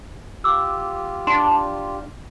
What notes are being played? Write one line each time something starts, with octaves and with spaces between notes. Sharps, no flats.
F4 G4 D6 E6
D4 C6